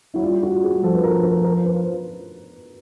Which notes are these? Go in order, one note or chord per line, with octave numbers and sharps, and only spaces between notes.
F#3 E4
G3 F4
F#4
G#4
F3 A4
B4
A#4
A#4
A#4
B4